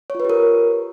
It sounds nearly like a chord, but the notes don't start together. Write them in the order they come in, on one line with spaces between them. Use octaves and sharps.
C#5 F4 B4 G4 A#4